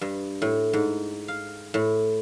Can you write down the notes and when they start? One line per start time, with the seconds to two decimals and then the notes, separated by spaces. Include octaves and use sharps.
0.01 G2
0.42 A2
0.73 G#2
1.28 F5
1.74 A2